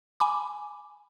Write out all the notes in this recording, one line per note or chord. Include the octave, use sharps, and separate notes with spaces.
G#5 B5 D6